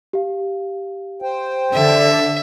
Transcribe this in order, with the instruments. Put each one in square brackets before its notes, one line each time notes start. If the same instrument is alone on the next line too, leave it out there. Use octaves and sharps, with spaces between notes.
[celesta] G4 F5
[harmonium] C5 G5
[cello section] D3 [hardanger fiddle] E5